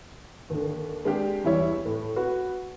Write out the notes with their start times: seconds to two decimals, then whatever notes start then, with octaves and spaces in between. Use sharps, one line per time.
0.50 D#2 D3
1.05 G#3 D4 G4
1.44 E2 G3 E4 C#5
1.85 A2
2.16 F#4 B4